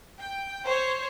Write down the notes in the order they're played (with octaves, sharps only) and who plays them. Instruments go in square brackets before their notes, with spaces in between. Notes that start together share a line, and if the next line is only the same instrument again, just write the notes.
[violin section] G5
C5 C#5